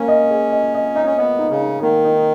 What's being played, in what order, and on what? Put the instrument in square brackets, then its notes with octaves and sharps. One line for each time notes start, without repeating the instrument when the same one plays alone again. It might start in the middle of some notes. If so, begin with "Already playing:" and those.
Already playing: [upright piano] A#3 [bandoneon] C#4
[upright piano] D#5
G#4
D#5
D#5
[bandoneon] D#4 [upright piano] D#5
[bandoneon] C#4
[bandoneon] B3 [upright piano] D#5
[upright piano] D#4
[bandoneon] C#3
[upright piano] D#4
[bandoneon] D#3 [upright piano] A#3
[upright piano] D#4